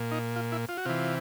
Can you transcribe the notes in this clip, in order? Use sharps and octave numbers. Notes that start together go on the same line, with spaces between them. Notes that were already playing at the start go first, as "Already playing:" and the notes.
Already playing: A#2
D#4
F4
E4
F4
F#4
C3 E3 F4